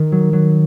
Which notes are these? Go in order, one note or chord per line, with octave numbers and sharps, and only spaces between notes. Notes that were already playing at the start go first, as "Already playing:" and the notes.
Already playing: D#3
F#3
F#3